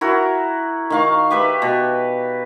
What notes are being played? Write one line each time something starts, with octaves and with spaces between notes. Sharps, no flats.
E4 F#4 A#4
D#3 F5 C#6
G4 B4 E5
B2